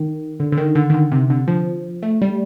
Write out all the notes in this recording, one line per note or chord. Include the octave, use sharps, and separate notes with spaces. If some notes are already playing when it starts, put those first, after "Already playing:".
Already playing: D#3
D3
D3
D#3
D3
D#3
D3
C3
D3
F3
A3
G3